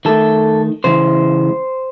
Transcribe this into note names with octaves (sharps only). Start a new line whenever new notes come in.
D#3 A3 A4
C#3 E3 G#3 C5